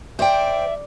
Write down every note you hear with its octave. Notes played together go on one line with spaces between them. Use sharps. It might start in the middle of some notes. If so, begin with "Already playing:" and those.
C5 D5 E5 G5